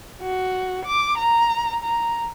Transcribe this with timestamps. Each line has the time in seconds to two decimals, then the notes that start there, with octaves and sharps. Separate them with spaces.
0.22 F#4
0.85 D6
1.18 A#5
1.83 A#5